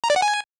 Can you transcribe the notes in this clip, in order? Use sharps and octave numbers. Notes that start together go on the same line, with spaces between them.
A#5
D5
F#5
G#5